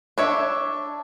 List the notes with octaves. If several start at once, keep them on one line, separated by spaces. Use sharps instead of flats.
D4 C#5 E5